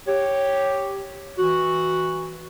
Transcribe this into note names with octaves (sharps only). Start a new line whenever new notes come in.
G4 C#5
E3 F#4